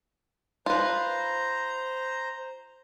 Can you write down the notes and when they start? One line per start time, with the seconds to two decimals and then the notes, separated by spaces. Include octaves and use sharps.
0.66 F4 B4 C5 A#5